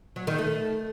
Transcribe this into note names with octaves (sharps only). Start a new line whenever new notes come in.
F#3
D#3
A3